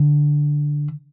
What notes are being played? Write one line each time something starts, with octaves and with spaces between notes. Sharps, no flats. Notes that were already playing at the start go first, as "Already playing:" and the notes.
Already playing: D3